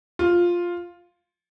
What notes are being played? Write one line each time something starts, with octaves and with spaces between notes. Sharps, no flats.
F4